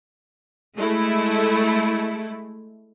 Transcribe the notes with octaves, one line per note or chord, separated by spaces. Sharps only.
G#3 A3 E4